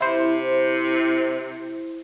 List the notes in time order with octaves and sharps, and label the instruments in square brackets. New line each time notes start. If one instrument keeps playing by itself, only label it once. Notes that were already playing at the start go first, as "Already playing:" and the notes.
[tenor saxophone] C3 [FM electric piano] E4 C5